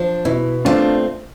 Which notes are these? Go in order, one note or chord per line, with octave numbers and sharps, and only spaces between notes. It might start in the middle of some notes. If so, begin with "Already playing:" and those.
Already playing: F3 D4
B2 E4
A3 C4 D4 F4